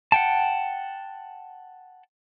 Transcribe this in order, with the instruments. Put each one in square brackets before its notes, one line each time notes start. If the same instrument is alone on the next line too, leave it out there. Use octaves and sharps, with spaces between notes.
[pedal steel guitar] F#5 G5 A5